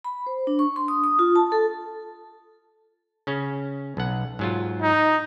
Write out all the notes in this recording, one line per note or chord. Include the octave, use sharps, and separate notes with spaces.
B5
C5
D4
C#6
C6
D#6
D#6
F4
A5
A4
C#3 C#4
B1 F#5
G#2 F#3 F4
D#4